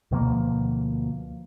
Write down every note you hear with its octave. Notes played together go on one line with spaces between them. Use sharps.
D2 B2 F3 A#3